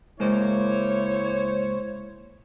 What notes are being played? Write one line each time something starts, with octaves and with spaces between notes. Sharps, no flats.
C#2 G#3 A#3 E4 C5 C#5